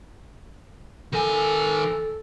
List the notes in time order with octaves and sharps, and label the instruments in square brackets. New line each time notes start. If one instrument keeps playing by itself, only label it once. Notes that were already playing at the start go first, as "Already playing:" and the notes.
[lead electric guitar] D#3 G#5 [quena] A4